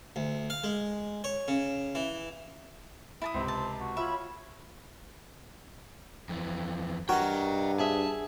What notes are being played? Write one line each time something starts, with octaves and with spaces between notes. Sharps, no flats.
D2
F5
G#3
C#5
C#3
E3
E4 A5 D#6
C#2 C3 C4
A5
F#4
F4 C#5 E5 B5
F2 E3
G2 F#4 A#4 C#5 D#5 G5
G#4 E5 A5